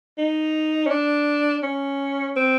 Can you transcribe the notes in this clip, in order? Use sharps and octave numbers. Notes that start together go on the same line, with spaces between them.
D#4
C#4
D4
C#4
C4